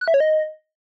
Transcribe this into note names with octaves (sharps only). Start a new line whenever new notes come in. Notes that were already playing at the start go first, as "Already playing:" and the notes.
F#6
E5
C#5
D#5